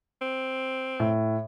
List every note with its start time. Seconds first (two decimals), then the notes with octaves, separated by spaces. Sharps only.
0.21 C4
1.00 A2